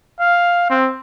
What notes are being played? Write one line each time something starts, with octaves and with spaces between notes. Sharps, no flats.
F5
C4